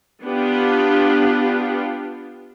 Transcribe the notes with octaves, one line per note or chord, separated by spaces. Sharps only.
B3 D4 F4 G4